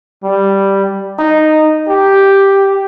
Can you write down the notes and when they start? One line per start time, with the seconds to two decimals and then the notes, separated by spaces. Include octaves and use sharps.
0.24 G3
1.19 D#4
1.89 G4